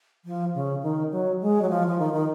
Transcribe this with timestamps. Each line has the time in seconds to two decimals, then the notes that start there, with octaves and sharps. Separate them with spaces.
0.25 F3
0.54 C#3
0.83 D#3
1.11 F#3
1.41 G#3
1.62 F#3
1.70 F3
1.88 F3
1.99 D#3
2.13 D#3